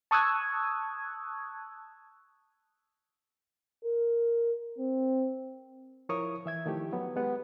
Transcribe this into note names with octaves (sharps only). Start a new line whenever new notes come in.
A5 C#6 D#6 E6 F#6 G#6
A#4
C4
F3 E4 A#4 C#5 C#6 D#6
E3 E5 G#6
D#3 F3 A3 E4 G4
F#3 B3
G#3 B3 G4